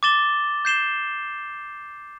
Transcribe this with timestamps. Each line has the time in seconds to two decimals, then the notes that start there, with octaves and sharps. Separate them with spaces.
0.03 D6 A6 E7 G7
0.65 G6 C7 E7 G7